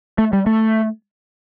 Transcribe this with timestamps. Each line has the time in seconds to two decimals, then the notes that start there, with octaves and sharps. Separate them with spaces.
0.18 A3
0.33 G3
0.46 A3